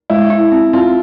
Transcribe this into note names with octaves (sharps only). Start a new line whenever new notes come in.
G#3 E4
E4
C4
C4 F4